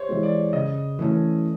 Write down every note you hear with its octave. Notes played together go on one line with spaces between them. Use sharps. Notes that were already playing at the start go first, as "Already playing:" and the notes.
Already playing: C5 C#5
E3 G#3
D5
C#3 D#5
E3 A3 C#4